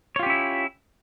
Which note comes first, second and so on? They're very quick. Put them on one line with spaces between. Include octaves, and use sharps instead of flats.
C#5 F4 G4 C#4 E4